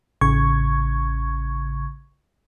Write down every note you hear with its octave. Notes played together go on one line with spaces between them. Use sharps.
A1 C#3 C#6 G#6